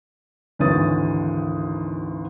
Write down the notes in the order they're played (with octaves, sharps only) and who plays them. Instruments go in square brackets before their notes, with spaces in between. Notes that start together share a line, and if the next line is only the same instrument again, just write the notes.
[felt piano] G#1 D2 E3 C#5 D#6 A6